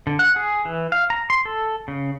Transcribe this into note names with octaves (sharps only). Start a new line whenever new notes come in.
D3
F#5
G#4
E3
F5
A#5
C6
A4
C#3